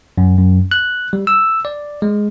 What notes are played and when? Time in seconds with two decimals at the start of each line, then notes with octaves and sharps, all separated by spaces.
0.18 F#2
0.38 F#2
0.71 F#6
1.13 G3
1.27 E6
1.65 D5
2.02 G#3